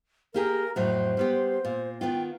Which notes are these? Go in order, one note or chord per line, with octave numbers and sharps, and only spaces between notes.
A#3 G4 G#4 A#4
F2 A2 F#3 C5
G3 B3 G4
A#2
D#3 B3 F4 G5